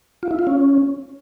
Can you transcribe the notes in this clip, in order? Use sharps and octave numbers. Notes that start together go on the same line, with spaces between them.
F4
E4
F4
C#4